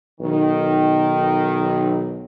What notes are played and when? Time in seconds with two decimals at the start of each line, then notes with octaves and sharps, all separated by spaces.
0.20 B1 D#3